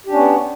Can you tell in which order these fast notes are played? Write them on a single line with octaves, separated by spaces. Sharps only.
G4 D4 C#4 B3